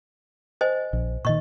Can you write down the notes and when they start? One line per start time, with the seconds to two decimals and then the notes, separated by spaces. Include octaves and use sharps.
0.61 C5 D#5 G#5
0.93 A#1
1.25 A#2 D#3 D#5 C#6